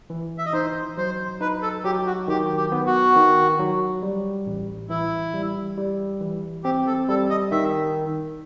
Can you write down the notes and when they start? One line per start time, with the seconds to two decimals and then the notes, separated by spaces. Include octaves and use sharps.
0.10 E3
0.38 E5
0.46 D#5
0.53 D#4 C5
0.97 F#3 C5
1.41 D#4 B4
1.62 A4
1.84 F#3 G4
2.06 F#4
2.28 D#3 G4
2.57 G4
2.72 B3
2.86 F#4
3.16 D#3
3.60 F#3
4.03 G3
4.46 A1
4.89 E3 E4
5.33 G3
5.77 G3
6.21 E3
6.64 C4 G4
6.86 A4
7.08 G3 A4
7.30 D#5
7.51 D#3 E5